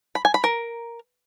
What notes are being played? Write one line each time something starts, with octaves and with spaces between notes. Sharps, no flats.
B5
G#5
B5
A#4